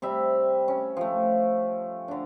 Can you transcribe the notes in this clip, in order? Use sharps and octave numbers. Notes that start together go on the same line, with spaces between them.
C3 G3 E5
C#4
F3 A3
D3 D4